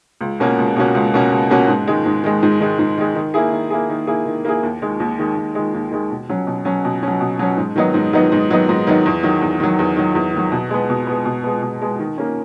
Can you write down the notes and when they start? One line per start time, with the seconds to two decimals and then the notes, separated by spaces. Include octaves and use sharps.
0.21 C#2
0.40 B2 A#3 C#4 F#4
0.59 C#2
0.76 B2 A#3 C#4 F#4
0.95 C#2
1.14 B2 A#3 C#4 F#4
1.31 C#2
1.50 B2 A#3 C#4 F#4
1.68 G#2
1.87 D#3 G#3
2.06 G#2
2.24 D#3 G#3
2.43 G#2
2.60 D#3 G#3
2.79 G#2
2.97 D#3 G#3
3.15 D#3
3.34 A#3 E4 G#4
3.52 D#3
3.70 A#3 E4 G#4
3.89 D#3
4.07 A#3 E4 G#4
4.26 D#3
4.45 A#3 E4 G#4
4.63 D#2
4.82 D#3 G#3
5.00 D#2
5.19 D#3 G#3
5.37 D#2
5.55 D#3 G#3
5.74 D#2
5.92 D#3 G#3
6.11 B2
6.29 F#3 C#4
6.47 B2
6.65 F#3 C#4
6.85 B2
7.03 F#3 C#4
7.21 B2
7.39 F#3 C#4
7.57 G#2
7.76 D#3 F#3 B3 D#4
7.94 G#2
8.13 D#3 F#3 B3 D#4
8.32 G#2
8.50 D#3 F#3 B3 D#4
8.69 G#2
8.87 D#3 F#3 B3 D#4
9.06 E2
9.23 D#3 F#3
9.41 E2
9.60 D#3 F#3
9.79 E2
9.97 D#3 F#3
10.15 E2
10.34 D#3 F#3
10.52 B2
10.70 G#3 B3
10.90 B2
11.07 G#3 B3
11.25 B2
11.44 G#3 B3
11.63 B2
11.82 G#3 B3
11.99 D#3
12.18 A#3 C#4